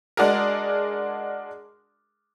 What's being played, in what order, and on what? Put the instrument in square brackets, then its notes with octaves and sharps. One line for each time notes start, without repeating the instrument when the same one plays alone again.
[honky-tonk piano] G#3 D4 F#4 G#4 A#4